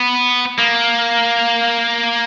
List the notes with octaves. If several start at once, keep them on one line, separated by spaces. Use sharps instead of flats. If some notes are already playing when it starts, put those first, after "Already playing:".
Already playing: B3
A#3